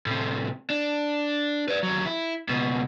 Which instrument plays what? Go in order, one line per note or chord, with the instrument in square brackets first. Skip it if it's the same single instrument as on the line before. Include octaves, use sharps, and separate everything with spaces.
[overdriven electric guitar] A2 C3
D4
B4 D5
D#2 F#3
E4
C#2 B2